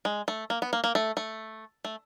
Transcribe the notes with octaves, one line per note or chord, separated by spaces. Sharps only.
G#3
A3
A#3
B3
A#3
A#3
A3
A3
A3